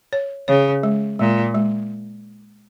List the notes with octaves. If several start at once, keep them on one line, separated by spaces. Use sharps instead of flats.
C#5
C#3 C#5
G#3
A#2 G#3
G#3